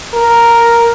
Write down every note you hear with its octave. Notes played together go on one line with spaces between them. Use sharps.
A#4